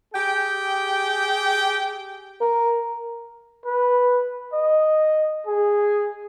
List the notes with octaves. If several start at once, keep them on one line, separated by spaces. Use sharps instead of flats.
G4 G#4 G5
A#4
B4
D#5
G#4